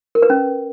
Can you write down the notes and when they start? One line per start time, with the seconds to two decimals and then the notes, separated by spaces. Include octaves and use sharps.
0.15 A#4
0.22 B4
0.30 C#4